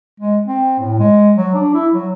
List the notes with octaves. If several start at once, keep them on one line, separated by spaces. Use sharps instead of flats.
G#3
C4
A2
G#3
F#3
D4
E4
F#3